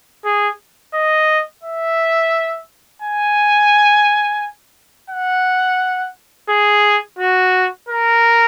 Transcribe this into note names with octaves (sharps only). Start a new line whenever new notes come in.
G#4
D#5
E5
G#5
F#5
G#4
F#4
A#4